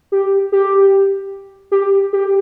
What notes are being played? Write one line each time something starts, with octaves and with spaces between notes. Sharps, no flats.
G4
G4
G4
G4